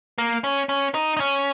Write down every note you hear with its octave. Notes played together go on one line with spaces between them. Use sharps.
A#3
C#4
C#4
D#4
D#4
C#4